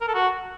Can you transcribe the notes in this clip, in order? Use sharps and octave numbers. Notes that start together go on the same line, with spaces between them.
A#4
A4
F#4